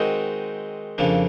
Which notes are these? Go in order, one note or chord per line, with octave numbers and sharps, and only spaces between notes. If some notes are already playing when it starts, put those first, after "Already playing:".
Already playing: D#3 G#3 C4 D#4 F#4
F2 C#3 F3 A#3 D4